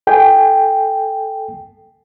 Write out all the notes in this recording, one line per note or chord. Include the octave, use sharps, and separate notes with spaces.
A4 G5 G#5